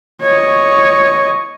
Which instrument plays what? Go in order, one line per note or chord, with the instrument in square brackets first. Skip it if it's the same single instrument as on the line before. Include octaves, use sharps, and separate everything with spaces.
[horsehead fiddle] C#5 D#5